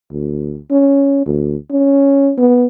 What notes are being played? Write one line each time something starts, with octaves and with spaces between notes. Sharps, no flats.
D2
C#4
D2
C#4
B3